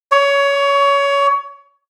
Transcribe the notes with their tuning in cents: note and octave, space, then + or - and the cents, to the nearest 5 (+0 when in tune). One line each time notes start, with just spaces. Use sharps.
C#5 +20